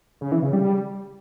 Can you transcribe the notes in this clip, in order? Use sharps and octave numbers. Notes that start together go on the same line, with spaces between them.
C#3
E3
C#3
G3